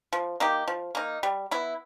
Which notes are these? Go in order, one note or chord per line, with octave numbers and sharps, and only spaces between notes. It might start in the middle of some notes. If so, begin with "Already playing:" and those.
F3
A#3 D#4 G4
F3
A#3 D#4
G3
B3 E4